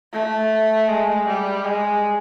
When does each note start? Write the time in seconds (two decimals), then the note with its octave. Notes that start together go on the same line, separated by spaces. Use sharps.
0.13 A3
0.88 G#3
1.27 G3
1.64 G#3